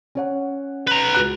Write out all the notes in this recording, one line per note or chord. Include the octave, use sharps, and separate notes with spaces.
C#4 C#5 F#5
B4 A#5
C#2 F#4 F#6